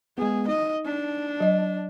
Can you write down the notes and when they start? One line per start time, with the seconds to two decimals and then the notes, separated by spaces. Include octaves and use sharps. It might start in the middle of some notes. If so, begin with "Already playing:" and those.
0.18 G#3 B3 G#4
0.48 D#4 D#5
0.85 D4
1.40 F#3 D#5